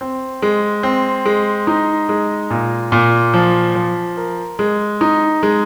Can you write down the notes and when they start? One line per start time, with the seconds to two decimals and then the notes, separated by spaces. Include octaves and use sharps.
0.01 C4
0.42 G#3
0.83 C4
1.25 G#3
1.67 D#4
2.09 G#3
2.50 A#2
2.92 A#2
3.34 F3
3.75 F3
4.17 A#4
4.59 G#3
5.01 D#4
5.43 G#3